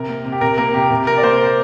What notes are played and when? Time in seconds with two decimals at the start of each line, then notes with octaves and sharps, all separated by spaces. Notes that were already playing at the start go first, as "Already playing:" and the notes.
Already playing: C3 A#4
0.09 A#3
0.25 C3
0.32 G4
0.41 C3 A#4
0.58 A#3 A#4
0.74 C3 G4
0.90 C3
1.07 C3 A#4
1.18 D5
1.23 A#3 C5